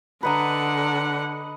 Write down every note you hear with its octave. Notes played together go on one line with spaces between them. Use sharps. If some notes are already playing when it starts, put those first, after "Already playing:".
D3 B4 D#5 F#5 A#5